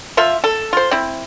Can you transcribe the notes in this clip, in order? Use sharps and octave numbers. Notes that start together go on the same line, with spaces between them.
F3 F4 E5
A4
F4 C5
C4 E4